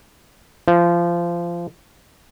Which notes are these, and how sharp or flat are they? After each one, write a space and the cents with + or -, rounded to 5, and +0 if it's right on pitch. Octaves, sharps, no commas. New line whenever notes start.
F3 -20